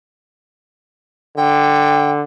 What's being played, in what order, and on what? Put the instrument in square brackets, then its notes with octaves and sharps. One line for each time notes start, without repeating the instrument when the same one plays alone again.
[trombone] D3 [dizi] G5